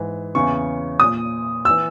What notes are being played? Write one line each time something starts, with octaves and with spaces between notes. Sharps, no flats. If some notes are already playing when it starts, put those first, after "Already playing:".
Already playing: G#2 E3
E2 C#3 E3 C#6
A#2 D#6
E3 E6